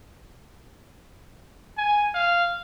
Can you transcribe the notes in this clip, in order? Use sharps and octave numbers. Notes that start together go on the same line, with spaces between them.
G#5
F5